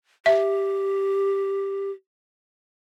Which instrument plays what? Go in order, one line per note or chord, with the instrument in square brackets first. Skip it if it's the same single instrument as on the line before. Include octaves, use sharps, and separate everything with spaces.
[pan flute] G4 [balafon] E5